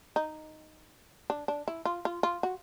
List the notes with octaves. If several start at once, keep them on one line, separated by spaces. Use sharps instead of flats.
D#4
D4
D4
E4
F4
F4
F4
F#4